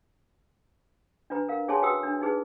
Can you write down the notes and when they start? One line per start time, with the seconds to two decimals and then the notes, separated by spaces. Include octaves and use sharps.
1.30 D4 F4 B4 A#5
1.48 A#4 F5
1.68 C#4 G#4 C#5 G#5 A5 C6
1.82 F#4 B4 G5 C6 D#6 E6
2.03 D4
2.22 D#4 G#4 B4